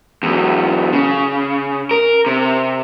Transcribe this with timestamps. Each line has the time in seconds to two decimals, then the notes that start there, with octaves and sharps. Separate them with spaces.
0.23 E2 F#3
0.93 C#3
1.91 A#4
2.26 C3